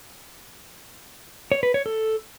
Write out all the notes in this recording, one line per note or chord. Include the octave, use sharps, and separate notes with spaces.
C#5
B4
C#5
A4